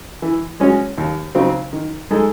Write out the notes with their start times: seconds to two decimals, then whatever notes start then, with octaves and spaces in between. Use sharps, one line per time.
0.22 E3
0.60 G#3 C#4 F#4 C#5
0.98 D#2
1.35 C#3 F#3 C4 D#4
1.73 D#3
2.11 G#3 D#4 A4